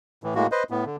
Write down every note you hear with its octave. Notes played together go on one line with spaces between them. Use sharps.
A2 E3
A2 G#3 A#3 F#4
B4 C5 D#5
A2 B3
D3